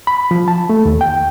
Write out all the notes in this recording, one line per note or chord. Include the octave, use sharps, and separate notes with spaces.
B5
F3
A5
A3
D#2
G5